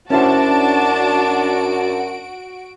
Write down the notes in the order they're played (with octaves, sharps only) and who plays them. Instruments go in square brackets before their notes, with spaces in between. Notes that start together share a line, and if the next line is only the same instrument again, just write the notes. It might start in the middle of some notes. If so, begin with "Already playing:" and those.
[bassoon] F#2 [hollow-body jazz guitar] C#4 E4 C5 [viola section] D4 A5 [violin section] F#4 D7